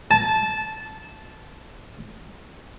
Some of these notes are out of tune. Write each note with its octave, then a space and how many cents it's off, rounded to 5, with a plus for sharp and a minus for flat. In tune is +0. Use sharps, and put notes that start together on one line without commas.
A5 -15